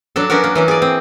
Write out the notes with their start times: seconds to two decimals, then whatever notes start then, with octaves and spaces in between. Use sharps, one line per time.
0.16 F#3 D4 F#4 A4
0.30 B3 C#4 D4 F#4 A#4
0.44 A#3
0.55 E3 F#3 C#4
0.68 G#4 D5
0.82 C4